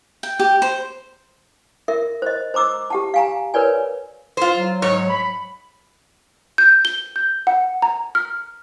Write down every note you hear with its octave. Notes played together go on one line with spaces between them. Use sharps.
G5
G4
C5
A#4 E5
C5 D#5
C5 A#5 D6 E6
G4 F#5 A5
F5 G#5 A#5
A#4 B4 C#5 D5 G#5
F4 C5
F#3
G#2 C#5
B5
G6
G7
G6
F#5
A#5
F6